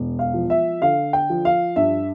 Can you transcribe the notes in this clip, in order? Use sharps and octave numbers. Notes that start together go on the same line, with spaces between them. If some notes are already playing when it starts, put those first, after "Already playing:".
Already playing: E1
F5
F3
E5
D3 F5
G5
F3
F5
G2 E5